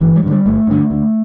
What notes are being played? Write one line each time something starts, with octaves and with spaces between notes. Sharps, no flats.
G1 E3
G3
G2
D3 G3
G1 A3
G2 D3
D2